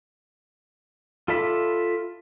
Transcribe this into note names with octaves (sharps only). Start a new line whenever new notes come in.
F4 A4 D5 E5 B5